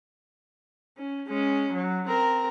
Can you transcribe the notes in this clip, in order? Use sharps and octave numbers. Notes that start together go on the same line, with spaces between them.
C#4
G#3 C#4
F#3
C4 A#4